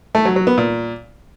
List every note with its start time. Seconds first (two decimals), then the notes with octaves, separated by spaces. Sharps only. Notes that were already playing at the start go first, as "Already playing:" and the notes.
0.15 A3
0.25 F#3
0.36 F#3
0.47 B3
0.58 A#2